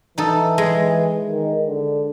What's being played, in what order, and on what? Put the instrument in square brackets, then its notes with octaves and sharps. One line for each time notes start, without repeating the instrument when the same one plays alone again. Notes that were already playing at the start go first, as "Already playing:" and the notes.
[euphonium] E3 [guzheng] D#4 A4
[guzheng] G#3
[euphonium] D#3
D3